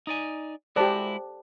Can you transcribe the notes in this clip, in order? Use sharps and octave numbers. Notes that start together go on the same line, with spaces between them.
D#4 D5 G#5
G#3 E4 F#4 G4 A4 C5 D5 A5